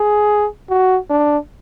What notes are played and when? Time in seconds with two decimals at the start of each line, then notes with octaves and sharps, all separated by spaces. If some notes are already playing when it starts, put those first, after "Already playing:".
Already playing: G#4
0.70 F#4
1.10 D4